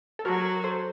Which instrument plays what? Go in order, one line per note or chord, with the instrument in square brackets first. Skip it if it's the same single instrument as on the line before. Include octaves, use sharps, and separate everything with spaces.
[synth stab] A4
[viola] F#3 [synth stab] F#4 A#4
[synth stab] A4 C5